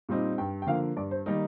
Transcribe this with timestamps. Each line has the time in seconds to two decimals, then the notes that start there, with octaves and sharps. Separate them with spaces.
0.09 A#2 G3 C4 D#4
0.38 G2 G5
0.62 G5
0.67 D3 F3 A#3 F5
0.96 G2 D5
1.11 C5
1.26 D#3 G3 A#3 D#4 A#4